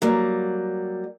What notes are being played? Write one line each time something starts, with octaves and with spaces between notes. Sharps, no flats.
F#3 G3 A#3